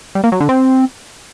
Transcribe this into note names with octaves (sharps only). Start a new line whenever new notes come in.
G3
A#3
F#3
D3
C4